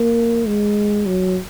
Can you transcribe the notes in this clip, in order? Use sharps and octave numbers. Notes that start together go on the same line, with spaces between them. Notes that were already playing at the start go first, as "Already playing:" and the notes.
Already playing: A#3
G#3
F#3